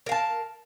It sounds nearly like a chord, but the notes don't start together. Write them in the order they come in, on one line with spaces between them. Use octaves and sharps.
A#4 F5 A5